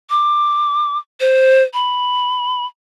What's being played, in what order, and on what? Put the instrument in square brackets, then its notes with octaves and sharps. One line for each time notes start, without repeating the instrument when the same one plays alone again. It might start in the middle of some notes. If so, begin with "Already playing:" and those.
[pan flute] D6
C5
B5